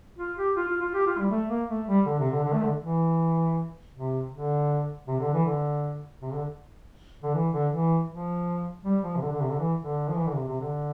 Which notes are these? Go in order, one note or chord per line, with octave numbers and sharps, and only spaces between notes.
F4
G4
F4
F4
F4
G4
F4
G3
A3
A#3
A3
G3
D3
C3
D3
D3
A3
D3
E3
C3
D3
C3
D3
E3
D3
C3
D3
D3
E3
D3
E3
F3
G3
F3
C3
D3
D3
C3
D3
E3
D3
F3
E3
D3
C3
C3
D3